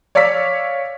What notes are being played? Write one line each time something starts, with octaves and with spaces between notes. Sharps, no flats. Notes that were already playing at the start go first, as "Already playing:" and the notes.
C#5 D5 F5 E6 B6